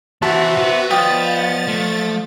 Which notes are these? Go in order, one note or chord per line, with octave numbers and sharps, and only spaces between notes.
E3 F#4 C5 E5 A5
B3
F3 D5 D#5 G5 A6
A3